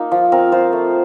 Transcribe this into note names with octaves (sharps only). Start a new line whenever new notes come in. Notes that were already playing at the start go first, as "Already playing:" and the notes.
Already playing: A#3 D#4 F4
F3
C4 A#4
F4 C5
A3